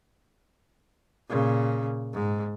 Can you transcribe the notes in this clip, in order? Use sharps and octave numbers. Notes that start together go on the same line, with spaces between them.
A#2 C#3
G#2